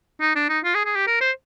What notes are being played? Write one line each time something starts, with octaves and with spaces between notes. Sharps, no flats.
D#4
D4
D#4
F4
G#4
G#4
G4
A#4
C5